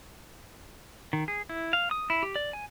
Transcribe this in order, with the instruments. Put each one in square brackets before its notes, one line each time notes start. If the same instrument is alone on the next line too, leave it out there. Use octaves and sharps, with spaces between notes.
[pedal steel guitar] D#3
G#4
E4
F5
D#6
E4
G4
D5
G#5